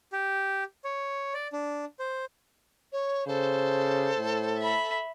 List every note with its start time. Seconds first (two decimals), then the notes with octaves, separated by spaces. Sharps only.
0.13 G4
0.84 C#5
1.34 D5
1.53 D4
1.99 C5
2.92 C#5
3.28 C#3 A4 C5
4.18 A2
4.57 E5 B5